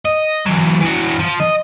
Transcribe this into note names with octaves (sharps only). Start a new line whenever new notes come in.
D#5
E3 F#3
E3 F#4
F3
D#5